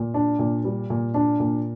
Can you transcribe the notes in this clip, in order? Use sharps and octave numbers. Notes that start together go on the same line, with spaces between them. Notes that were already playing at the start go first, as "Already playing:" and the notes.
Already playing: A#2
D4
A#2
G3
A#2
D4
A#2